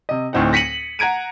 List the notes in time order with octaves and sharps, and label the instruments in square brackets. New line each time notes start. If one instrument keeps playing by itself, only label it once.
[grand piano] C3 D#5
D2 A2 C4 D#4 F#5
A#6 B6 C#7 D#7 F#7
F#5 A#5 G#6 D7 D#7